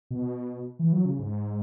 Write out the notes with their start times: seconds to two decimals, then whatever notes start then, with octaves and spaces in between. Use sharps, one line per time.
0.11 B2
0.79 E3
0.93 F#3
1.05 C#3
1.19 G#2